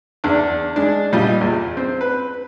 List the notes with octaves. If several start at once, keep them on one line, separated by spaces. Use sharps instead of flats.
E2 D4
G#3 D4
A#2 G3 F4 D#5
E2
C4
B4